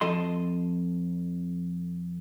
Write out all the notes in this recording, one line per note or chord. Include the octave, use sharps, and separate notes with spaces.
F2 A4 D#5 C6